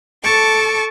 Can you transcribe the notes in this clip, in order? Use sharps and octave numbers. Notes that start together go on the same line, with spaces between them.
A4 A5 C#6 D6